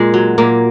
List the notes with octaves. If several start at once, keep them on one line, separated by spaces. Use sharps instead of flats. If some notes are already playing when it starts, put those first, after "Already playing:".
Already playing: A#2 G#3
F#3
A#2 A#3